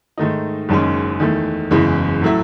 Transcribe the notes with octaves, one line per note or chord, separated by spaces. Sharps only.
G#2 D#3 A3 D#4
F#1 F#2 D#3 G#3 C#4
E2 D#3 A3
F#1 E2 C#3 E3 G#3
A2 F#3 A3 E4